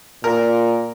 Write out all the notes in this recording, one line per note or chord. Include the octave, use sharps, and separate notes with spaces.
A#2 A#4